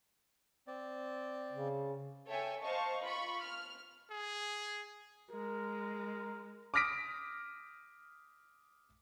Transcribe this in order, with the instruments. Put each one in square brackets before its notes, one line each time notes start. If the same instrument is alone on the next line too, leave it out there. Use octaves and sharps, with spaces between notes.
[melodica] C4 D5
[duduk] C#3
[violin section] A4 C#5 E5 G5 G#5
C5 D#5 F5 A5 C#6
F4 B5 C#6
F6
[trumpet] G#4
[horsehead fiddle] G#3 [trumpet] A#4
[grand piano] D6 D#6 F6 A#6 B6 D7